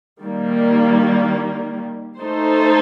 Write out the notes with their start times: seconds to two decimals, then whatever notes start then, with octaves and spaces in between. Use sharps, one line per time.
0.21 D#3 G3 A#3
2.22 A3 D#4 A4 C5